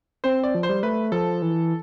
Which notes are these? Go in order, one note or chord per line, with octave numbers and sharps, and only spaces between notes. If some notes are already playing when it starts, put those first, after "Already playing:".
C4 C5
D5
F3
C5
G3
A3 B4
F3 A4
E3